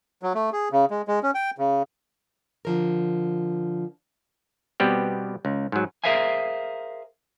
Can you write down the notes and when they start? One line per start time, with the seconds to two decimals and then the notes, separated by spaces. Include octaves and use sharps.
0.23 F#3
0.35 A3
0.53 G#4
0.71 C#3
0.91 G#3
1.08 G#3
1.23 C#4
1.35 G5
1.58 C#3
2.65 D3 F3 A#4
4.80 B2 G3 B3 C4 G4
5.45 C#2
5.72 G#2 F#3
6.04 G#4 A#4 C5 E5 F5 G#5